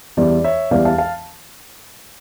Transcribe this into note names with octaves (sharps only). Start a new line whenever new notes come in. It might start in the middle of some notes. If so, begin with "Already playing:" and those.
E2 E3 G3 D5
C#5 E5
E2 E3 G3 D5 F5
F5 A5
F5 A5